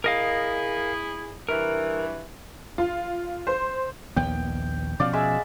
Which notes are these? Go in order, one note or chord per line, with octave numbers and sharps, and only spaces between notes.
E4 G#4 A#4 D#5 F5
G2 E3 A#4
F4
C5
A#1 D#2 B3 G5
B2 F3 C#4 D5 F5
G#3 E5 E6